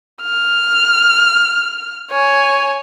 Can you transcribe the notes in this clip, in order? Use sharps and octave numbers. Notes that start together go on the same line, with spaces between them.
F6
C#5 G#5